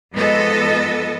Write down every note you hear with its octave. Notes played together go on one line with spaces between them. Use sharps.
G#2 F3 B3 A4 D#5